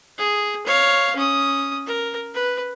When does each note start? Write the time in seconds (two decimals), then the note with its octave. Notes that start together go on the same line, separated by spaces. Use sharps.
0.18 G#4
0.66 C#5 F5
1.16 C#4 D#6
1.86 A#4
2.34 B4